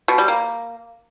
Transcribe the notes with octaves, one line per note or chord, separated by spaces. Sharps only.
B2
G3
A#3